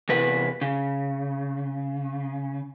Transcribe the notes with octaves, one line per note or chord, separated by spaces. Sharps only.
E2 C3 B4
C#3